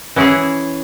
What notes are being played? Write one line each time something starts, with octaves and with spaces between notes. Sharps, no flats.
E3 C#4 E4 G#4